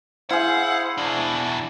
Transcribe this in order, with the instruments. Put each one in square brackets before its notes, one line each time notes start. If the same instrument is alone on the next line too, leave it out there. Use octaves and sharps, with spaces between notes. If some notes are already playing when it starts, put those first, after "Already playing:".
[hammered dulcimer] E4 G#4 [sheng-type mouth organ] C5 F5 [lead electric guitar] F#5
[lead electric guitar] E2 B2 [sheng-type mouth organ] D4